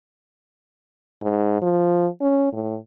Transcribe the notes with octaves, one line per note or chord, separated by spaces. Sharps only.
G#2
F3
C#4
A2